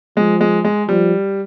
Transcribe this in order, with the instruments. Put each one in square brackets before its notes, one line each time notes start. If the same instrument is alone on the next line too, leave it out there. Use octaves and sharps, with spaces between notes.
[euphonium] F3 [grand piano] G#3
[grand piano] G#3
G#3
[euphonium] F3 [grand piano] G3